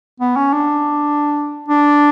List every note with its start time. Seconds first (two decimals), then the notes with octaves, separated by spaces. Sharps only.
0.20 B3
0.36 C#4
0.53 D4
1.68 D4